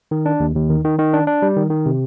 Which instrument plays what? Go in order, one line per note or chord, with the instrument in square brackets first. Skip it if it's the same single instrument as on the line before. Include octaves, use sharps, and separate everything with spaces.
[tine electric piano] D#3
D4
D#2
D#2
D#3
D#3
D#3
D4
D4
G3
D#3
D#3
C3